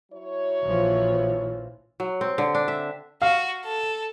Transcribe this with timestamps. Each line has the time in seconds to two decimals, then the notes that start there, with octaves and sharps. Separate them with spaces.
0.12 F#3 E4 C#5
0.63 A#1 E3 F3
2.00 F#3
2.21 C4
2.38 D3
2.55 D4
2.68 E5
3.22 F#4 F5
3.65 A4